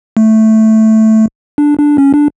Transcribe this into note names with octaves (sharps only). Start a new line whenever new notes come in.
A3
D4
D4
C#4
D4